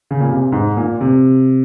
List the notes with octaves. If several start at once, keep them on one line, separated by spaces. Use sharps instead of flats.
C#3
A#2
C3
G#2
A#2
C3